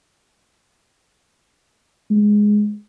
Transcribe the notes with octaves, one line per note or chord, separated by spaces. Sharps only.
G#3